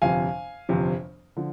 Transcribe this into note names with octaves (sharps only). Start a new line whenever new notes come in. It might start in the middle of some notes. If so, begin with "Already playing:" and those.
G1 F2 C3 F3 F5 G#5
G1 F2 C3 F3
D3 F3